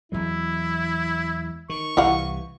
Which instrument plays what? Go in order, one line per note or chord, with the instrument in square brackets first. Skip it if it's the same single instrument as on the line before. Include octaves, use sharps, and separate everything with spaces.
[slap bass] E2 F#3 G#3 [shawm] E4
[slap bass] D#3 [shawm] C#6
[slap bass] C2 C3 E3 [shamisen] E4 F5 F#5